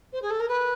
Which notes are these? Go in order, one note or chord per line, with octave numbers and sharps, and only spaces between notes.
C5
G#4
A4
A#4
B4